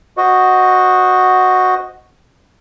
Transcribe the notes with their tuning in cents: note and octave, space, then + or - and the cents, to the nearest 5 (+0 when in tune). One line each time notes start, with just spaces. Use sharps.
F#4 +0 C5 +0 D#5 +0